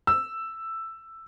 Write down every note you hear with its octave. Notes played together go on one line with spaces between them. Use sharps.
E6